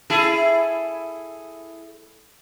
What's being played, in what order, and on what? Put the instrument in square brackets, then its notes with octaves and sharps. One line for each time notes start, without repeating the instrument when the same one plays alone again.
[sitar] E4 G#4 A4